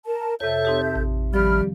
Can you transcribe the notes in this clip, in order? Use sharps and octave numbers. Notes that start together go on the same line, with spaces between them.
A#4 A5
F2 C3 A4 C#5 E5 G6
C4 D#4 G4
A1
D#3 F3 G3 B5 F6